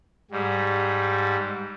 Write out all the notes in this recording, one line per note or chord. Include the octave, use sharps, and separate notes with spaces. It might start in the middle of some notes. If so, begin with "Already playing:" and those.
G#2 G3